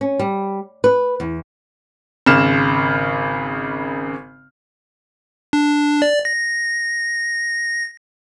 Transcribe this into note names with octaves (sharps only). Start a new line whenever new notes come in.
C#4
G3
B4
E2
G#1 C#3 F6 E7
D4
D5
A#6